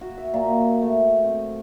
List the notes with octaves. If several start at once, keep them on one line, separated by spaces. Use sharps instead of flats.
F#4
E5
A#2
A3
C4